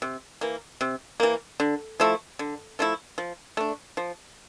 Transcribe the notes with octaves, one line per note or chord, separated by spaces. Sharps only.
C3
E3 A#3
C3
E3 A#3
D3
F3 A3 E4
D3
F3 A3 E4
F3
A3 D4
F3